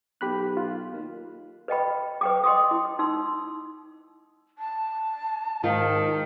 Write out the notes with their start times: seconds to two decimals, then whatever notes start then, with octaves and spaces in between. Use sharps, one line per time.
0.21 B1 G4 B5 F#6
0.57 F4
0.93 D#2
1.68 B4 D#5 G5 B5
2.21 B4 G5 D6
2.44 D#5 G5 C6 D6 D#6
2.71 E4
2.99 D#4 C6 E6
4.58 A5
5.63 G#2 D#3 F4